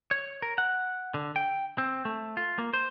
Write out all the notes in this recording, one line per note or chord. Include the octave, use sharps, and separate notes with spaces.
C#5
A#4
F#5
D3
G5
C4
A3
F4
A#3
C5